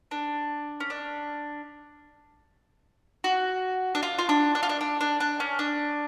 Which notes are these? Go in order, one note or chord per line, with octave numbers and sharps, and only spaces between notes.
D4
C#4
D4
F#4
D4
F4
F4
D4
D4
F4
D4
D4
D4
D4
C#4
D4